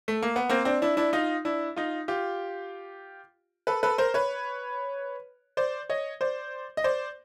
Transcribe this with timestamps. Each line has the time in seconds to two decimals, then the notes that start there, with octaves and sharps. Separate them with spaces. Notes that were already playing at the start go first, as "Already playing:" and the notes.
0.08 A3
0.22 A#3
0.36 B3
0.49 A#3 C4
0.65 C4 D4
0.82 D4 E4
0.97 D4 E4
1.13 D#4 F4
1.45 D4 E4
1.76 D#4 F4
2.08 F4 G4
3.67 A4 B4
3.83 A4 B4
3.98 A#4 C5
4.14 B4 C#5
5.57 C5 D5
5.90 C#5 D#5
6.21 C5 D5
6.77 D#5
6.84 C5 D5